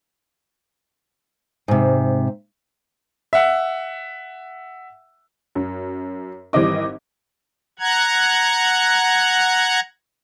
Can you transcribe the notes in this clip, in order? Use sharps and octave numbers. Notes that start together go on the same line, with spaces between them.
G#2 C3
E5 F#5
F#2
G#1 E3 G3 C4 D#5 D6
F#5 A#5 F#6 G#6